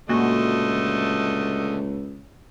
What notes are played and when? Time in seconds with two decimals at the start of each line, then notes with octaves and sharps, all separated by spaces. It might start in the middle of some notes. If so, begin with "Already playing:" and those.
0.09 C#2 A#2 D3 A3 F#4 D#5